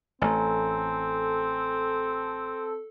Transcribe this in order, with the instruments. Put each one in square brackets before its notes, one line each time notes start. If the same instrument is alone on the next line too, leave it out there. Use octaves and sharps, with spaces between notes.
[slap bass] A1 A3 [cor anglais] C4 [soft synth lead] A4 [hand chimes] G#5 A#5